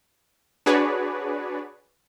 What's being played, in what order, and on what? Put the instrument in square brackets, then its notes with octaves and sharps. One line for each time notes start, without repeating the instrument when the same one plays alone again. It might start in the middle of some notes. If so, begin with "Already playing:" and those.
[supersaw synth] D4 F#4 G#4 B4 C#5 D5